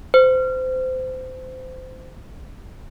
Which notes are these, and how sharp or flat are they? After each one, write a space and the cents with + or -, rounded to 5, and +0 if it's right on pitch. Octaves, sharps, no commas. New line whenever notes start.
C5 -25